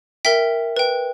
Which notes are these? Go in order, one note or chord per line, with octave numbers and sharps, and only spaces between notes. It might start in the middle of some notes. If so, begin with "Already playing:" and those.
A#4 E5 G5 B6
B4 G5